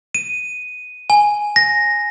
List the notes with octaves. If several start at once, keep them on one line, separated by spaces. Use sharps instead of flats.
D#7
G#5
A#6